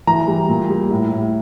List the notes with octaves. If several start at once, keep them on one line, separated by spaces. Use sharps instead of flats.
E3 A#5
G3
A#2
G3
A2
A2